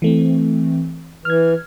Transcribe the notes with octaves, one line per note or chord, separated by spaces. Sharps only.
E3 A3 C4
E3 F6 G#6